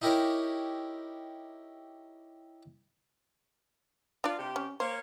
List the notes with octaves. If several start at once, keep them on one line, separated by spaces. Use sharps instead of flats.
D#4 E4 G4 A#4 C#5
D4 F4 D5
C3 G4
C#4
A#3 C5 C#5